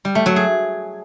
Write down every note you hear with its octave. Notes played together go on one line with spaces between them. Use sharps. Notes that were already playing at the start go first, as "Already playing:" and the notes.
G3
A3
F#3
G#4